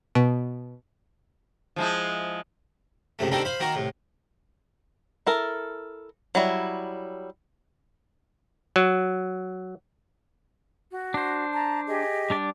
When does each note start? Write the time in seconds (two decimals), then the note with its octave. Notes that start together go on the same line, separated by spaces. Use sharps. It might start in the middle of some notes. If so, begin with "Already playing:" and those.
0.15 B2
1.76 F3 G#3 E4
3.19 C#2 F#2 C3 A3
3.31 D#3 G3 A#3 C4 D4 A4
3.45 C5 F5 B5
3.60 D#3 A#3 F#4 A#4
3.75 C2 A2
5.26 E4 A4 A#4
6.35 F#3 G3 E4
8.76 F#3
10.90 F#4
11.14 D4 C5
11.53 A5 A#5
11.88 G4 G#4 D#5
12.30 G3 D4 D5